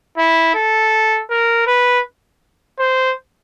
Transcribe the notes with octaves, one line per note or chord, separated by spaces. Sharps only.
E4
A4
A#4
B4
C5